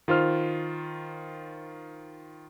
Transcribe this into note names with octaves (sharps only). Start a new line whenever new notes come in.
D#3 F4 C5 F6